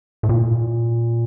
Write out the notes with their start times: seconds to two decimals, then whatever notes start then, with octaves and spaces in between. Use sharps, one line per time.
0.23 A2
0.29 A#2